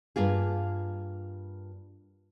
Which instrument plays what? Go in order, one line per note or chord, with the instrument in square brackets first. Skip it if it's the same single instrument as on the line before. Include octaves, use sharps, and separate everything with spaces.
[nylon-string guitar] G2 A#3 F4 G#4